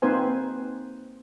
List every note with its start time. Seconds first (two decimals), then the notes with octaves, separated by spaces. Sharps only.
0.02 A#3 C4 D#4 B4 C5 G#5